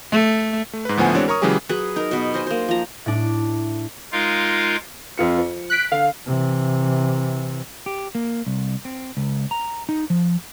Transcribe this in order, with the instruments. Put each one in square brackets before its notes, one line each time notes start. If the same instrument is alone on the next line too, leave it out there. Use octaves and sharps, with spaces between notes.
[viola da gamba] A3
[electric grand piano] A3
G#2 B4
D2 A2 F3 B3 F#5 G#5
E3 G#3 C4 D4 F#4 C#5
A#4 C#5 A#5 C#6 D#6
C#3 E3 F#3 G#3 G4 G#4
[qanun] F#3 G#4 B4
D#4 A#4
B2 B3
C5 D#5 G#5
A#3 C5
F3 A#5
[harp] A2 D4
[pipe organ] G#3 D#4 F4 A#4 F5
[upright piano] F2 F4 C#7
F3
[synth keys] F#6 B6 D7
[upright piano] D3 [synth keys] F5
[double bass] C3 E3
[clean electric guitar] G4
A#3
C2
C4
C#2
A#5
D#4
F3